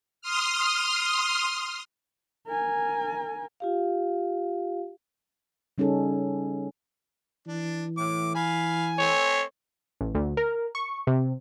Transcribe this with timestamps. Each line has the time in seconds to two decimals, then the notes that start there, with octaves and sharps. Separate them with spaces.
0.21 C6 D#6 F6
2.47 A#4 G#5
3.60 F4 G4 F5
5.78 C#3 G3 C#4 D#4 G#4 A4
7.47 E3 D4
7.97 A2 D6
8.35 F5 G#5 B5
8.99 A3 C4 C#5
10.01 A1
10.15 D2
10.37 A#4
10.75 C#6
11.07 C3